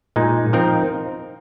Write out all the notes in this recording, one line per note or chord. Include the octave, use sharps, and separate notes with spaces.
A#2 G#3 D#4
F3 C4 D#4 A#4